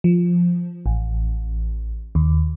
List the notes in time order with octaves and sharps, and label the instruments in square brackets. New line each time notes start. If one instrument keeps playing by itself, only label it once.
[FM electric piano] F3
A1
D#2